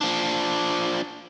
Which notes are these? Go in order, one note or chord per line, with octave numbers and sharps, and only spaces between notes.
F3 D4